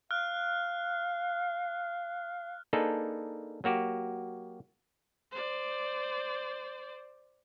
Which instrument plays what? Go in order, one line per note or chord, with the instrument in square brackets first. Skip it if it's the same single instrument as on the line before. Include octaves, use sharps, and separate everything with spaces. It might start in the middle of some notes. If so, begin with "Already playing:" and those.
[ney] F5 [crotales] F6 F#6
[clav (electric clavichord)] A#3 D4 D#4 G#4 A4 B4
F#3 A#3 F#4 G4
[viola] C5 D5